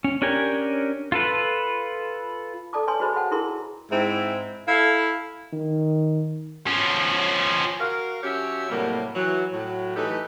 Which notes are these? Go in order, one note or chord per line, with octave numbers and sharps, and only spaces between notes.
C#4
C#4 D4 G4 A#4 G#5
F4 A4 B4
A4 D5 A5 A#5 D6
B4 C#5 G#5 A5 C6
F#4 G#4 B4 C5 D#5 B5
F#5 G5 A5
E4 G#4 A#4 A#5 C6
A#5
G#2 G#3 C4 E4
E4 A4 E5 F5
D#3
F3 C#4
F#4 A#4 F5
F3 C#4 F#4 G4 C#5 E5
A2 C3 F#3 G3 A#3
E3 F#3
A2 F#3
E3 A3 D#4 G4 A4 B4